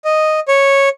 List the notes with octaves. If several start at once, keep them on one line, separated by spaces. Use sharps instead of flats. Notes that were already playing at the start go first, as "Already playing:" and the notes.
D#5
C#5